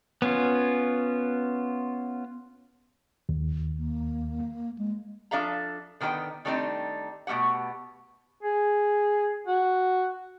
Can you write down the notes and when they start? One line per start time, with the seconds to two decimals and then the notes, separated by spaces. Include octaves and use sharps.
0.22 B3 C#4 F4
3.29 D#2
3.77 A#3
4.78 G#3
5.31 F3 D4 A4 E5 F5 A#5
6.01 D3 D#3 B3 G#4 D#5 G5
6.45 D#3 G3 A3 C4 D4 D#4
7.27 B2 A3 A#3 G4 F#5
8.43 G#4
9.47 F#4